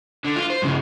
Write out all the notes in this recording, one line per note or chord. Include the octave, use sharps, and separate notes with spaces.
D3
F4
C5
G2 C#3